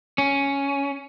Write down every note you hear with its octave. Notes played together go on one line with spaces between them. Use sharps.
C#4